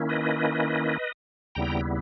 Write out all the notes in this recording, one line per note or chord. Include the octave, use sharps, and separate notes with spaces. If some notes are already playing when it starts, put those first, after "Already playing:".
Already playing: D#3 A#3 C#4 E4
B4 D#5
D#2 C#3 G3 B3 E4 G5 A#5